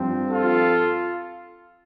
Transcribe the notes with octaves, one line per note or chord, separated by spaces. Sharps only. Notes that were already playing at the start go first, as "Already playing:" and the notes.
Already playing: G2 F3 C4
F4 A4